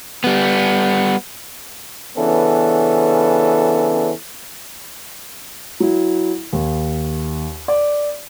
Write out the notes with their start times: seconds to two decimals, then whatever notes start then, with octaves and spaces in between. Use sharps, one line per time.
0.24 G3 B3
2.17 C#3 E3 B3 C#4 D4 A4
5.80 F#3 E4
6.53 D#2
7.68 D5